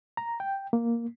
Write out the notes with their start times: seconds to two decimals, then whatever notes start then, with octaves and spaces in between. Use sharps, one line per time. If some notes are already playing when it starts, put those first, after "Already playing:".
0.17 A#5
0.40 G5
0.73 A#3